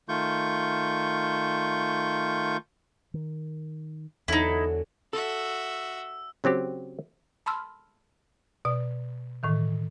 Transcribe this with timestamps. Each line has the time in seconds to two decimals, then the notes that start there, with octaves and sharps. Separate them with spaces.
0.09 D#3 A3 F4 C#6 G6
3.14 D#3
4.28 E2 D3 E3 F#3 D#4 E4
5.13 F#4 A4 E5 E6
6.44 C#3 F#3 C4 G4
7.46 A5 B5 C6 E6 F6
8.65 B2 D5
9.43 A2 D#3 E3